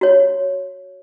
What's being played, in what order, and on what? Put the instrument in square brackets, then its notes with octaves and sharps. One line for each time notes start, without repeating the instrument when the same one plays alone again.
[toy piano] F#4 C#5